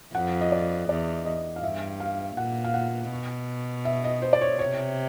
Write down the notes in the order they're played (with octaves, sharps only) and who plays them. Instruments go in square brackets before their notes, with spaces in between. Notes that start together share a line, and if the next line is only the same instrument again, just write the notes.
[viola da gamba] F2 [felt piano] F#5
[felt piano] D#5
D5
[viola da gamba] E2 [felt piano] D5
[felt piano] D#5
F5
[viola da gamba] G2 [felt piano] E5
[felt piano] F5
[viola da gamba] A#2 [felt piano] F#5
[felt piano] F5
F#5
[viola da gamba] B2
[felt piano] E5
D#5
C5
D5
C#5
[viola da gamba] C3 [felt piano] C#5